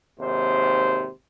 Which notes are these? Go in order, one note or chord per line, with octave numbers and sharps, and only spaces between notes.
G#1 D#2 C3 C5